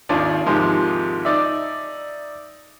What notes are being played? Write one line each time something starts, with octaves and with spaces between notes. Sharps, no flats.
G#1 D#2 D4 D#4 F4 D5
D#2 G#2 C3 D#3 F3 G#3
D#4 D5 E5